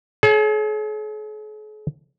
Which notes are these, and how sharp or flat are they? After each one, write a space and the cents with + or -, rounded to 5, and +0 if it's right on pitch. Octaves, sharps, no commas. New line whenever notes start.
G#4 +45 C#5 +0